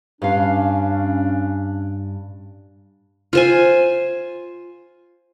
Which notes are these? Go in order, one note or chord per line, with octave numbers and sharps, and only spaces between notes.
G2 C#4 D4 F5
F4 C5 G#5